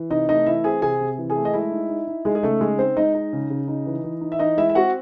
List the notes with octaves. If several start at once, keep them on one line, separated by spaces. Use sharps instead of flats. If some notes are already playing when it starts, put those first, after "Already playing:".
Already playing: E3
C3 D#4 D#5
A3 D#4 D#5
E3 E4 E5
C4 G#4 G#5
C3 G#4 G#5
C3
E3
G#4 G#5
A3
D#5
G#3 E4 E5
D#4
D#4
D#4
G#3 D#4 G#4
G#4
C#3 A3 A4
G#3 D#4 G#4
C4 D#4 C5
G#3 D#4 D#5
D#4
C#3
C#3
D#4
E3
E3
D#4
E5
E3 D#4 D#5
G#3 E4 E5
E5
C4 F#4 F#5